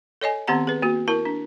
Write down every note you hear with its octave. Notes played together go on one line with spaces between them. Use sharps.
A4 C#5 D#5 G#5
D#3 B3 C4 G4 F#5 A#5
G#4 B4
A#3 F#4
E4 A#4 A5
D4